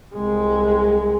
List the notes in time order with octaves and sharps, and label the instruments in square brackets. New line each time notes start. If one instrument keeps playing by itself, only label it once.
[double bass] C2 G#3